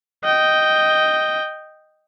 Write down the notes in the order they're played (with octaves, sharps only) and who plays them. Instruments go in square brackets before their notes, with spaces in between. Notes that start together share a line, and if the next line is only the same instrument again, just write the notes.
[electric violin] D#5 G5